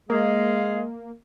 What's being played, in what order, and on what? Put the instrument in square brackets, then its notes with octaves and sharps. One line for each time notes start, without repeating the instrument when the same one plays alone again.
[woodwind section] G#3 G#4 F5 [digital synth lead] A#3